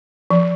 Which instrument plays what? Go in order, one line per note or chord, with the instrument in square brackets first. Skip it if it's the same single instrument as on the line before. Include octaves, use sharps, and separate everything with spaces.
[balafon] F3